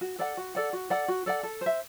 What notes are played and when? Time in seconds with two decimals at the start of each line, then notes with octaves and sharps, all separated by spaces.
0.01 F#4
0.19 A4 D5 F#5
0.37 F#4
0.55 A4 D5 F#5
0.73 F#4
0.90 A4 D5 F#5
1.08 F#4
1.26 A4 D5 F#5
1.43 A4
1.61 C5 E5